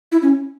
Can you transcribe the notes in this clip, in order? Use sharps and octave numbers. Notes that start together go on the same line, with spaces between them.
E4
C#4